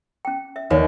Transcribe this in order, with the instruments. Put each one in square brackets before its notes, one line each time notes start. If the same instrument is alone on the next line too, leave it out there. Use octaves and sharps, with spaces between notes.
[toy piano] C#4 G5
E5
[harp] D#2 [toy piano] B4 C#5